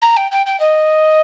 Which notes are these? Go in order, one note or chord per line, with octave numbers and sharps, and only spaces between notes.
A#5
G5
G5
G5
D#5